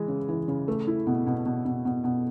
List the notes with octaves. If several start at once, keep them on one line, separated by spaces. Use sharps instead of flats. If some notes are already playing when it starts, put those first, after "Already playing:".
Already playing: E3 G#3
C#3
E3
C#3
A3
E4
B2
B2
B2
B2
B2
B2